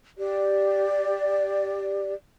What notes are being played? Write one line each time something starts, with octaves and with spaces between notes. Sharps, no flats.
G4 D5